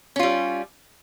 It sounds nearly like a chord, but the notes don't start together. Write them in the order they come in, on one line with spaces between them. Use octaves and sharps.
C#4 F4 G3